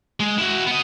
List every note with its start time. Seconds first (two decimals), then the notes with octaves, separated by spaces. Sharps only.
0.20 G#3
0.38 E4 F#4
0.67 B3 D#5